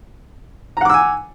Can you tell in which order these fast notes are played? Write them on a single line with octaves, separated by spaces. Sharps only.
A#5 F#5 D6 E6 G#5